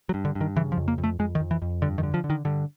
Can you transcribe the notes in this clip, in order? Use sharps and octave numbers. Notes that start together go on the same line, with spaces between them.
F#3
G2
D3
G2
D#3
C#3 E3
F3
F2
A#3
F2
A3
F2 G#3
D#3
F2
E3
F2
G2 D3
D#3
D3
F3
D3
D#3
G2 D3